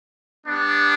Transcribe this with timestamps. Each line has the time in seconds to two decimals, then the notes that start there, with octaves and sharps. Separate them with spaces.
0.46 G3 B3 D4